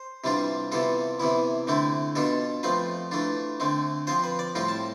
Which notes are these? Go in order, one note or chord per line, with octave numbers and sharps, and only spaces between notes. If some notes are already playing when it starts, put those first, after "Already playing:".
Already playing: C5
C3 E3 G3 D4 F4
C3 E3 B3 F4 A4
C3 E3 B3 E4
D3 A3 C4 E4
B2 B3 D4 F4 A4
F3 A3 C4 F4 B4
E3 A3 D4 F4
D3 A3 C4
F3 C4 F4 C5
B4
D5
A2 G3 C4 F4 G5
A5